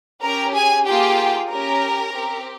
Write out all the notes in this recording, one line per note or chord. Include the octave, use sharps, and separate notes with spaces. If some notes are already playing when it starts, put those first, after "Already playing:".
C#4 G4 A#4 A#5
G#4 G#5
A#3 F4 G4 G#4 G5
C#4 G4 A#4 A#5
C4 G4